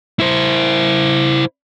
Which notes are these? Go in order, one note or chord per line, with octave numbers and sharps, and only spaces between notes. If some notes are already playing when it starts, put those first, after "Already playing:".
E4 C5